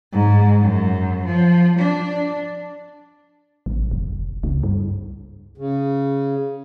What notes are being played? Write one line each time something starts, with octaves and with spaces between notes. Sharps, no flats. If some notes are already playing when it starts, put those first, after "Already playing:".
G#2
F#2
F3
D4
A1
F1
C#2
G2
C#3